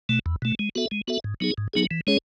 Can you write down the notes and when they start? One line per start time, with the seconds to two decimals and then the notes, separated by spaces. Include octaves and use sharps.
0.09 B2 A3
0.26 E2
0.42 B2 A3
0.59 G#3
0.75 B3 F#4 A4 E5
0.91 G#3
1.08 B3 F#4 A4 E5
1.24 G#2
1.41 F#3 B3 D#4 G#4
1.58 G#2
1.74 F#3 B3 D#4 G#4
1.91 E3
2.07 G#3 C#4 G#4 C#5